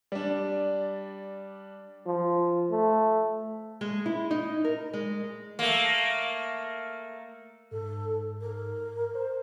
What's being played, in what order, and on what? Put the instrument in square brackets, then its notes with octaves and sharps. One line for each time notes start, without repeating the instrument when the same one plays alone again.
[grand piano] G3 D4
[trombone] F3
A3
[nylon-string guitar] G#3
E4
D#4
A#4
G#3
[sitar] A3 A#3
[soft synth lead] G#2 [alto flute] A4
[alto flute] A#4
[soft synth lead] C5